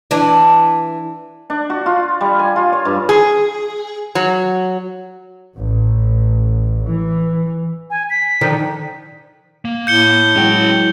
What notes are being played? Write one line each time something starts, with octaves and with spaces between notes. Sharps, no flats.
E3 D4
D4
F#4
F4
G3
G#5
F4
C#5
G2
G#4
F#3
A1
E3
G#5
B6
D3 D#3 F3
A#3
A2 G6 C#7 G7
E3 F#3 G#3 C#4 G5